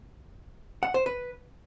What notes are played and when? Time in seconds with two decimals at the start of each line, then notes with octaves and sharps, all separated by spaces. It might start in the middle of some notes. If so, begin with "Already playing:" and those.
0.83 F#5
0.94 C5
1.06 B4